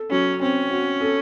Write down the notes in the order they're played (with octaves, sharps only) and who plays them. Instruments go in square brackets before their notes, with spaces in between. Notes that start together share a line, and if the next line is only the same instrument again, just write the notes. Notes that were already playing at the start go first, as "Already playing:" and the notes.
Already playing: [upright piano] A4
[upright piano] F#3 [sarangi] C#4
[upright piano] C4 [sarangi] C#4
[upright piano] F#4
A4